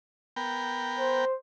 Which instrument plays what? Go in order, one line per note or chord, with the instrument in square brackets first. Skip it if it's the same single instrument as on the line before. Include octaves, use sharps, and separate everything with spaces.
[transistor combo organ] B3 A#4 G5
[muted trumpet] C5